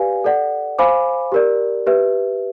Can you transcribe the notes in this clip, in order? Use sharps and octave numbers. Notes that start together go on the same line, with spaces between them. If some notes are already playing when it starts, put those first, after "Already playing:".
Already playing: G4 B4 D5 F5 G#5
A4 D5 F#5
C5 F5 G#5 B5 D6
G4 A#4 D5
G4 B4 E5